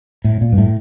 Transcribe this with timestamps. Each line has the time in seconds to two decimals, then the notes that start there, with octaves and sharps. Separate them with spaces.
0.24 A2
0.41 A#2
0.52 G2
0.58 A2